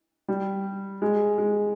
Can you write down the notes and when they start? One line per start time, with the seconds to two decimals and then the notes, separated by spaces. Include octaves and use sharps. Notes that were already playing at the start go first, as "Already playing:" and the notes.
0.28 G3
1.02 G#3
1.38 G#3